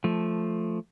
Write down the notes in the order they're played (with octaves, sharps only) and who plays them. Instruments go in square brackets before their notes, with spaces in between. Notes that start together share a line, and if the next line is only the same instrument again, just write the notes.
[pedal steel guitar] F3 A3